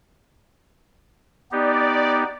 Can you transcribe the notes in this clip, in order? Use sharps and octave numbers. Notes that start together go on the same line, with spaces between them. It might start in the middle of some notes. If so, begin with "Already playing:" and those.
B3 D#4 G4 D5